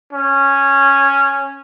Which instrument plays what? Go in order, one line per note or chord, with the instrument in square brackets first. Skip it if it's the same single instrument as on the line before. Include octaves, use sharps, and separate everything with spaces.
[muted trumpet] C#4